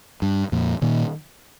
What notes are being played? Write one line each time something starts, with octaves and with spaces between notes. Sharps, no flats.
G2
F2 A#2
A#2 D#3